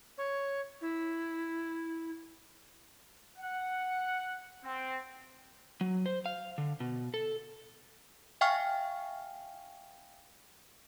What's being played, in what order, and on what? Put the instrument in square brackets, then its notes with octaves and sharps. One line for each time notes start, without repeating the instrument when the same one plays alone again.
[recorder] C#5
E4
[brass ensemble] F#5
C4
[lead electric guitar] F#3
C5
F5
D3
B2
A4
[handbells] E5 F5 G5 G#5 C#6 F6